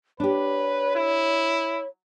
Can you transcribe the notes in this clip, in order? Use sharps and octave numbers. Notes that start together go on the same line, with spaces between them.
D4 G4 B4 C#5
E4